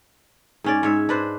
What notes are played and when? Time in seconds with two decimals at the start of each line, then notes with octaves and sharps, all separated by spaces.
0.64 G#2 C#4 D5
0.83 G#2 C#5 E5
1.09 D4 B4 C5